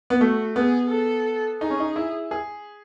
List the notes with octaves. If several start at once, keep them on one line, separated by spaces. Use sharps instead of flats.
B3
A3 F#4
B3 G#4
A4
D#4 G#4
C#4
D#4
E4
G#4